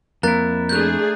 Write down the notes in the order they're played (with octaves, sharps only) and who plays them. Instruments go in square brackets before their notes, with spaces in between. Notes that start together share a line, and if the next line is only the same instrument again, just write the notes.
[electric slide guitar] F2 E4 [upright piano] A#3 [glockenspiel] A#5 F#6 A6
[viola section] A3 D4 G#4 [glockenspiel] F#6 G6